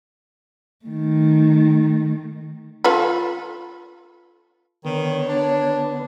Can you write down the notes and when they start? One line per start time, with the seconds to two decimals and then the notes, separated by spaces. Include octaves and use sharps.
0.85 D#3 A3
2.84 F4 A4 B4
4.85 D3 D#3 B3 C#5
5.28 D4